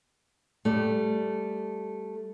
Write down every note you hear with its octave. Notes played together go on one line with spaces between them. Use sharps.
G3 A3